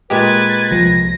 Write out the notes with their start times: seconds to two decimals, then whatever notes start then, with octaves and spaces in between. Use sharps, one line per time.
0.10 A#2 G#3 G4 B4 G#6 A6
0.71 C2 F3 A#6